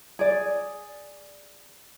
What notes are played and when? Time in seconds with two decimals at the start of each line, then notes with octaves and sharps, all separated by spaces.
0.19 G#4 D5